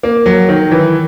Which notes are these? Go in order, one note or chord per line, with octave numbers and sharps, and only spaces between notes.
A#3
F#3
D#3
E3